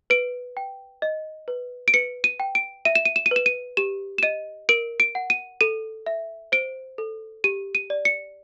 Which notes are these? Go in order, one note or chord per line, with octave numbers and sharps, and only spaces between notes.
B4 D7
G5
D#5
B4
D7
B4 C#7
D#7
G5
D7
E5 D#7
E7
D#7
E7
D#7
B4 E7
D#7
G4 E7
E7
D#5 D#7
A#4 D7
D7
F#5
D#7
A4 D#7
E5
C5 D7
A4
G4 D#7
D#7
D5
C#7